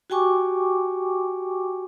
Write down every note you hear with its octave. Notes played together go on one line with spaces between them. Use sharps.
F#4 G4 G5 G#5 C#6 D6